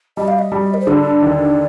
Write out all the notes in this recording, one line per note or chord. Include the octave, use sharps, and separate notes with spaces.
G3 D#5
F5
D#5
G3
A#4
C5
D3 D5
D#2